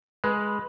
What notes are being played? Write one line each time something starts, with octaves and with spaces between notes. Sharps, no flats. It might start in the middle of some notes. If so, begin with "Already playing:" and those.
G#3 B4